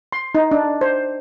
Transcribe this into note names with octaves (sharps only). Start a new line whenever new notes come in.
C6
D#4
D4
C5